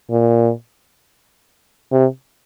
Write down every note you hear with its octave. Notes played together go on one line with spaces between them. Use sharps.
A#2
C3